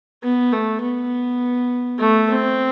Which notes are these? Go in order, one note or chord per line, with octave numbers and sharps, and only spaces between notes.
B3
A3
B3
A3
C4